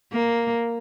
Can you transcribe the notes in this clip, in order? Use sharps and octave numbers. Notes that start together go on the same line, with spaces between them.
A#3